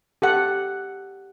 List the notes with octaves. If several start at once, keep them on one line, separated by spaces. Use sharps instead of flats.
G4 A4 F#5